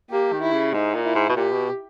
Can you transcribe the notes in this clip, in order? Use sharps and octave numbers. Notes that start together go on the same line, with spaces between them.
A#3 G4
D#3
E4
C#3
G#2 D#4
A#2
E4
G#2
B2
A#2 G4
B2